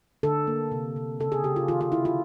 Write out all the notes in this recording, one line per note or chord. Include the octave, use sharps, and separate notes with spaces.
D3 A4
A#3
C3
C3
C#3 A4
G#4
C#3 G4
F4
D#3 F4
F4
D#3 E4
F4